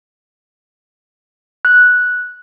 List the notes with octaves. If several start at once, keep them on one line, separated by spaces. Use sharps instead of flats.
F#6